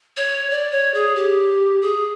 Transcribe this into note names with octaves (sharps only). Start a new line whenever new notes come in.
C#5
D5
C#5
G#4
G4
G#4